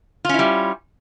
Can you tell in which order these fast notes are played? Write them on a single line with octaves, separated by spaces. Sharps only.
F4 C#4 E4 G3